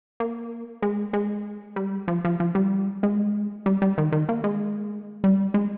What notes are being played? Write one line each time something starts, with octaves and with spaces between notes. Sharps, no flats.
A#3
G#3
G#3
G3
F3
F3
F3
G3
G#3
G3
G3
D#3
D#3
A#3
G#3
G3
G#3